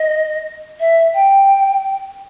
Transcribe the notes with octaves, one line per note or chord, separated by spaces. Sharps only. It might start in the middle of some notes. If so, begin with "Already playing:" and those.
Already playing: D#5
E5
G5